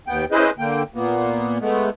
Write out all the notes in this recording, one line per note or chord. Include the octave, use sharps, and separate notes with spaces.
D#2 B3 G5
C#4 E4 G#4 B4 C5 D#5
D3 A#3 G5
A#2 A#3 B3
G#3 A3 B3